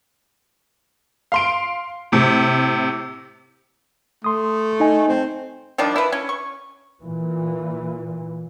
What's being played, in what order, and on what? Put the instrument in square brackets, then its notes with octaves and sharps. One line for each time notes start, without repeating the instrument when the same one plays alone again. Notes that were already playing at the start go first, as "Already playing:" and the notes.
[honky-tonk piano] F5 C6 D7
A2 C3
[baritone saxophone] A3 [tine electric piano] C6 D#6
[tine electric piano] D#4 D#5 G#5
[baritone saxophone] C4
[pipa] D#3 F3 G3 D4
E4 B4
C#4
C#6
[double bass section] A#2 E3